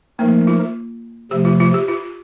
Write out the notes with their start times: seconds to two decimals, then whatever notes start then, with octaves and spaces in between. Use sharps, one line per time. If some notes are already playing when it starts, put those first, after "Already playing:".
0.19 F3 A3 A#3 D#4 A#4
0.47 F4
1.31 C3 F3 A3 G4
1.45 F4
1.60 F4
1.74 G4
1.88 F4